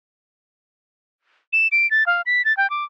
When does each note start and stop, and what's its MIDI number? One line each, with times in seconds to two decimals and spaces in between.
1.53 1.68 100
1.72 1.89 98
1.91 2.06 93
2.07 2.22 77
2.26 2.45 95
2.45 2.55 93
2.57 2.70 79
2.70 2.84 86